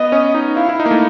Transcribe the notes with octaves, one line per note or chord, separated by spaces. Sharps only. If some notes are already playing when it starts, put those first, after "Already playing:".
Already playing: B3 D#5
C#4
D#4
E4 F5
E4
D#4
A#3
A3